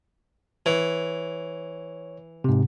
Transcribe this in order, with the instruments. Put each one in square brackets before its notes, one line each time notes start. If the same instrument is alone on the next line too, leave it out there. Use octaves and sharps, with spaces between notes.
[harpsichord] E3 [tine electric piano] C#5
[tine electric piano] G#2 C3